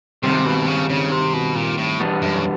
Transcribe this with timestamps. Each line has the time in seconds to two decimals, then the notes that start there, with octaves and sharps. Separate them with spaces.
0.23 G2 C3 D#3 G3 C4 D#4
0.46 B2
0.68 C#3
0.90 C#3
1.12 C3
1.34 B2
1.55 A#2
1.78 A2
2.00 E2 B2 G3 B3 D4
2.22 F#2